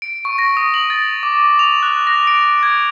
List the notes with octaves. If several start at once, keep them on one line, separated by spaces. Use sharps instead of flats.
D7
C#6
A#6
D#6
F#7
A6
D6
F7
F#6
A#6
D7
G#6